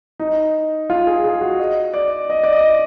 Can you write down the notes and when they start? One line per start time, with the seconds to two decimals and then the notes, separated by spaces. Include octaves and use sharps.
0.20 D#4
0.90 F4
1.07 G#4
1.24 G#4
1.41 F#4
1.60 D#5
1.94 D5
2.30 D#5
2.44 D5
2.53 D#5